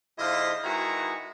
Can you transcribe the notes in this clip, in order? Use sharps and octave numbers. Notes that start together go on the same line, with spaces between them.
G#2 D3 E4 F4 C5 D#5
D#3 G#3 E4 F#4 B4 A#5